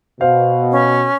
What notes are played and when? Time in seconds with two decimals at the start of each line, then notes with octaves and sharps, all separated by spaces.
0.21 B2 C5 F5
0.72 C#4